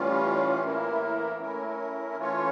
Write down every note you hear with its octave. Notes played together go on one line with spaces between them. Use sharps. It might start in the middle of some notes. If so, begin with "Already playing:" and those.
Already playing: A2 E3 G3 C#4 F4
A2 E3 A#3 E4 A#4
A3 C#4 E4 A#4
E3 A3 C#4 F4 C#5